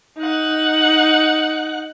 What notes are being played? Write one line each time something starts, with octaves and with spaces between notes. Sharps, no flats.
D#4 F#5